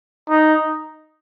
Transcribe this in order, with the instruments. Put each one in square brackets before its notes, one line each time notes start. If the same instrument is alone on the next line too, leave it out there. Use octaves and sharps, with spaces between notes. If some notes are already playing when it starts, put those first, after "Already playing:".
[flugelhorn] D#4